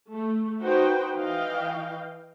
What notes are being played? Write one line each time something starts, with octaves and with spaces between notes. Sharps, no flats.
A3
D#4 F#4 B4 C5 G5
E3 D#5 F5 G5